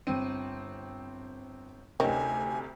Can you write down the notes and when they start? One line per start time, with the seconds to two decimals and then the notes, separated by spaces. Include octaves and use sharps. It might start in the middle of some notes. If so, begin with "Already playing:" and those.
0.07 G1 C4 D#7
2.00 D2 C3 D#3 C4 C#4 G#5